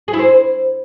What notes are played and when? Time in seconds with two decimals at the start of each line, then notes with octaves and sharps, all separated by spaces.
0.08 G#4
0.13 E4
0.19 C5